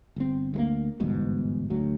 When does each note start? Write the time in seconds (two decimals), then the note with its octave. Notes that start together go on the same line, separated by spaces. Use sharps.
0.16 G1 C4
0.54 D2 G#3 A#3
1.00 G1 E2 G#2 B2
1.70 D2 F#3